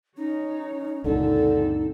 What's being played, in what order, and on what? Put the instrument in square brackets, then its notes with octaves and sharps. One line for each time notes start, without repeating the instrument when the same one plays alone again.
[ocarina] C#4 [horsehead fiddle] D#4 C#5
[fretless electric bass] C#2 F#2 A#2 [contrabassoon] D3 [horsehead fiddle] C4 A4 [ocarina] D#4